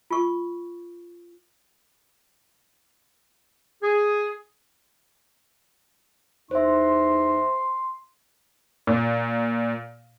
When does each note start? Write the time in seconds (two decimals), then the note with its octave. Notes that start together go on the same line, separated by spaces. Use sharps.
0.11 F4 C#6
3.82 G#4
6.51 E2 D#4 C5 E5 C6
8.87 A#2